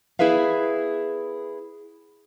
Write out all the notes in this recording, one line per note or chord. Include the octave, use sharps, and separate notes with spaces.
B3 E4 G#4 B4 E5 F5